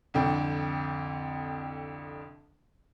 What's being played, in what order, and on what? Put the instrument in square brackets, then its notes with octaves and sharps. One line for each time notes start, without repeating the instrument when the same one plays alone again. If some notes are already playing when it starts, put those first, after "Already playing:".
[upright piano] C2 F2 D3 G5